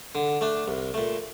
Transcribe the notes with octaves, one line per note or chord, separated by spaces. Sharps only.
D3
A3 D4
C2
A#2 A3